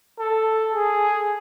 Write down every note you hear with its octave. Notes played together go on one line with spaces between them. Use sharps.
A4
G#4